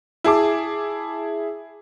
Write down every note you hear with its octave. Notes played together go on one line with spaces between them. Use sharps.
E4 G#4 A5 D6